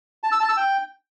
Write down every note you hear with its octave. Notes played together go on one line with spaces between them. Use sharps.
A5
E6
A5
E6
G5